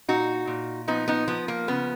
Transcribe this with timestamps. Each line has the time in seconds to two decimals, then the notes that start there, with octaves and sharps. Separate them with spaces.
0.08 A#2 D#4 F#4
0.47 A#2
0.88 F3 B3 D#4
1.08 B3 D#4
1.27 F3 B3
1.48 A#3
1.68 C#3 B3